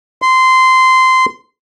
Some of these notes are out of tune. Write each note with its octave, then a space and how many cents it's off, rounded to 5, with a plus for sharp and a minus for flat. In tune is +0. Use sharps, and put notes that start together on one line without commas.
C6 -15